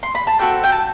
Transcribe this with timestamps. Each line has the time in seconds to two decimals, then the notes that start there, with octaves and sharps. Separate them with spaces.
0.03 C6
0.15 B5
0.27 A5
0.39 C4 F#4 A4 G5
0.64 G5
0.72 A5